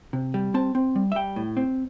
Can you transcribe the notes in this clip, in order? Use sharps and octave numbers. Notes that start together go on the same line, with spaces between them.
C3
G3
C4 A5
C4
G3
E5
G3 G5
A2
C4